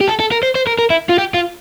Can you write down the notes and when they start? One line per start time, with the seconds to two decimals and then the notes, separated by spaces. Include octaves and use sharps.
0.01 G4
0.08 A4
0.20 A4
0.31 A#4
0.43 C5
0.55 C5
0.67 A#4
0.79 A#4
0.90 E4
1.09 F4
1.18 G4
1.34 F4